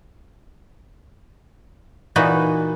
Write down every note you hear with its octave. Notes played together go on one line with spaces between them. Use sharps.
A#2 E3 B3 D#4 F#4